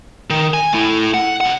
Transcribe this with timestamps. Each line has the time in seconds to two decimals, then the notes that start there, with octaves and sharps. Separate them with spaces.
0.30 D#3
0.54 G#5
0.73 A3 E4
1.14 F#5
1.41 C3 F#5